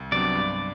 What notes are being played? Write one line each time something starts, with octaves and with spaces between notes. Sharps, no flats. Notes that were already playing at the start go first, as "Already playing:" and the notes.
Already playing: C2
C3 F#3 B3 D4 D5
G2